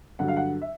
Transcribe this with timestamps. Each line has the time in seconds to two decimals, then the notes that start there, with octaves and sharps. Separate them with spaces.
0.19 G2 D3 F#3 F#5
0.28 F5
0.37 F#5
0.61 E5